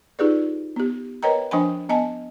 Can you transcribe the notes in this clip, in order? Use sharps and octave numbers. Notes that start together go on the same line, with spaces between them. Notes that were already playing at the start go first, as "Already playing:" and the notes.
D#4 F4 G4 G#4 B4 D5
B3 G4
A#4 B4 C#5 D#5 G5 A#5
F3 D4 C5 G5 G#5 B5
B3 D#5 G#5 A5